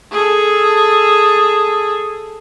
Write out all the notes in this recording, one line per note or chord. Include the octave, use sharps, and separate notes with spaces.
G#4 A4